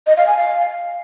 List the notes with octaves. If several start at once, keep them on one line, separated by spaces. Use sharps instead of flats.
D#5
F5
G#5
F5